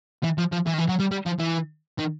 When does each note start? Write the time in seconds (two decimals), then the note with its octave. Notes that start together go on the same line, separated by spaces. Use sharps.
0.23 E3
0.38 F3
0.52 F3
0.66 E3
0.73 D#3
0.78 E3
0.89 F#3
1.00 G3
1.11 G3
1.26 F3
1.40 E3
1.99 D#3